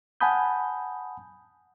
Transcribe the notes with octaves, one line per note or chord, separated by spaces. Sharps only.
F#5 G#5 A5 B5 D#6 G6